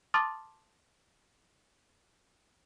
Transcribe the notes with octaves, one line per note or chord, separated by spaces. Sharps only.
A5 C6 D6 D#6 F6 A6